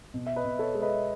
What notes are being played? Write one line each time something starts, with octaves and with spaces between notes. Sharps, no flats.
B2
E5
B4 D#5
B2
A4 C#5
G#3
B4 D#5